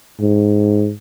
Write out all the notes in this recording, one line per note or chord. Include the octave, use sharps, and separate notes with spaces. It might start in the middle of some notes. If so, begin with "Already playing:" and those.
G#2